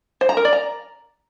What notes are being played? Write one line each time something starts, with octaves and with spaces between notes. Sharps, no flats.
C5
A#5
A#4
D5
A#5